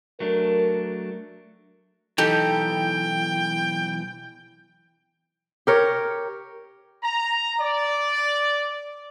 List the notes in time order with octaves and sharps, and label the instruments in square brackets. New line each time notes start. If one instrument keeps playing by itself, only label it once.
[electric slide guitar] F#3 A3 D4 [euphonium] A#4
[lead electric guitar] B1 E3 [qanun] D#4 A4 [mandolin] G4 [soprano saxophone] G5
[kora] G4 A#4 C#5
[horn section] A#5
D5